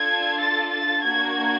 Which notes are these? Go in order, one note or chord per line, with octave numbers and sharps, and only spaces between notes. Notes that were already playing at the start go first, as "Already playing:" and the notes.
Already playing: D4 F4 A4 G#6
A6
A6
A#3 D4 F#4 G#6